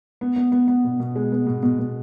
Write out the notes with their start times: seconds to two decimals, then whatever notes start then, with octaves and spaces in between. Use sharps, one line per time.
0.21 B3
0.36 B3
0.52 B3
0.68 B3
0.84 B2
1.00 B2
1.16 G#3
1.32 B3
1.47 B2
1.63 B2
1.79 B2